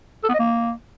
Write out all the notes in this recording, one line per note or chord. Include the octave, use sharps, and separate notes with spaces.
A4
B3
D#5
A#3